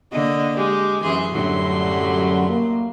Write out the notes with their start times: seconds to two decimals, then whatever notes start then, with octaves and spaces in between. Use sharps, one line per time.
0.12 D3 A#3 D#5
0.56 G#3 G4
1.03 F#2 E3 G#4 C6
1.33 F#2 A2 D3 F#3 G3
2.48 A#3